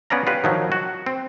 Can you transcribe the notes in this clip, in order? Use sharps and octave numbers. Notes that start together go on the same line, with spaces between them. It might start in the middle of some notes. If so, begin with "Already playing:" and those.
B3 C#4 D5 F5 A#5
F4 G4 B4
D#3 F3 F#3
F#4
C4